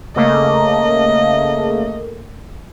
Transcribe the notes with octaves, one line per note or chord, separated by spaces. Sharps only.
C#3 A3 A#3 D#5